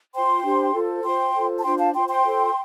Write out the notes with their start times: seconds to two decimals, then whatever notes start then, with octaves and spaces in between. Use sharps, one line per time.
0.14 F4 C5 G5 C6
0.44 D4 G4 C5
0.74 F4 A4 C5
1.04 F4 C5 G5 C6
1.34 F4 A4 C5
1.59 A5
1.63 D4 F4 C5 G5 C6
1.78 F5 A5
1.94 F4 C5 G5 C6
2.08 G5 C6
2.24 F4 A4 C5